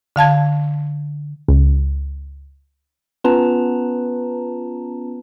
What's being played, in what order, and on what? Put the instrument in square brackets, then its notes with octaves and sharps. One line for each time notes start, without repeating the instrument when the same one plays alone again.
[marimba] D3 F5 A5 G#6
[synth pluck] C#2
[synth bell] B3 C#4 F4 B4 A5 A#5